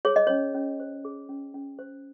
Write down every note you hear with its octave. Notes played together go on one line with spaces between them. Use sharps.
G#4 C#5
D#5
C#4 C#5
C#4
C5
G#4
C#4
C#4
C5